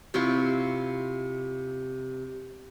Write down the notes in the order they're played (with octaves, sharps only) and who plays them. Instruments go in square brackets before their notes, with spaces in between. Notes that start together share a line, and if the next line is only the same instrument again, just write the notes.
[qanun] C3 E4 F4 C#6